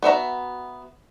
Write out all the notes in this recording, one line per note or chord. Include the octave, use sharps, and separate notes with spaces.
B3 F#4 E5 A#5